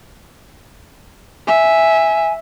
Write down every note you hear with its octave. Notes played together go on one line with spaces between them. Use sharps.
E5 G#5